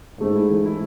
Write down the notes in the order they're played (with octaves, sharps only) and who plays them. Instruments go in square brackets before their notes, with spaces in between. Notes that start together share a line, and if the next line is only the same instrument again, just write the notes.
[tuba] G#2 [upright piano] A3
[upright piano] E4
E3
E4